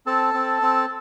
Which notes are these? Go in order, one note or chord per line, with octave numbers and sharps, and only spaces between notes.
C4 A4 A5
C4
C4